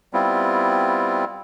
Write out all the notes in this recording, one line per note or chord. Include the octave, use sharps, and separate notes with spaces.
G3 B3 C4 E4 F4